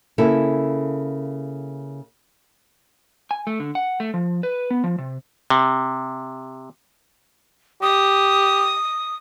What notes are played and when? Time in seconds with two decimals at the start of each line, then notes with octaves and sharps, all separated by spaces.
0.18 C#3 A#3 E4 A4
3.31 G#5
3.47 A3
3.60 D3
3.75 F#5
4.00 A3
4.14 F3
4.43 B4
4.71 B3
4.84 F3
4.98 C3
5.50 C3
7.82 G4 D#6